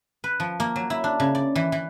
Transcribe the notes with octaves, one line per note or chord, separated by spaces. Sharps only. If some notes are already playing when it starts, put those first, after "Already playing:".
B4
F3
A#3
F#3
E4
D4
C#3
D5
E3
E3